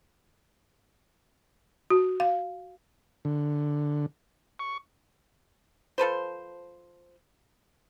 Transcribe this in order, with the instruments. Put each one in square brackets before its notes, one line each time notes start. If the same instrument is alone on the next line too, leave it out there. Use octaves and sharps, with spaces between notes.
[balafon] F#4
F5
[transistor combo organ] D3
C#6
[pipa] F3 A4 B4 C5